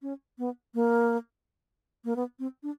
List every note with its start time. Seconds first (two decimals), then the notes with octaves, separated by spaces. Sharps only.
0.02 C#4
0.39 B3
0.74 A#3
2.05 A#3
2.16 B3
2.39 C4
2.63 D4